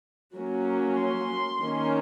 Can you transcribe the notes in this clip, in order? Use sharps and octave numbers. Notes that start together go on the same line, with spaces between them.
F#3 A#3 C#4
C6
D#3 A#3 C#4